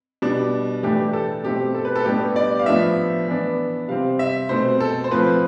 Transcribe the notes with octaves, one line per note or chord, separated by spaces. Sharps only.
B2 G3 D4
A2 E3 A3 D4 G4
G4
A4
B2 A3 C4 G4
A4
B4
A4
A2 G3 B3 D4 G4
D5
F5
A2 F3 B3 D4 E5
E3 B3 D4
C3 G3 C4 F5
E5
B2 A3 C4 C5
A4
C5
A2 F3 C4 B4